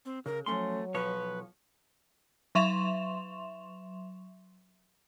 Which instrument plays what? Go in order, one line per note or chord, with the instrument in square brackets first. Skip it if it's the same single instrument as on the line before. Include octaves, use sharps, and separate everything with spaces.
[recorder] C4
[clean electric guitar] C#3 [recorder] A#4
[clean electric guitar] F3 C#4 C6 [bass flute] F#3 [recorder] A3
[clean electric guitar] B1 F3 C#5 [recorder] B4
[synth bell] F#3 E5 C6 C#6 E7 F7